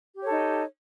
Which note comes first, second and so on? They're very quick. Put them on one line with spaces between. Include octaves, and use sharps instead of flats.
G4 C#5 A4 D#4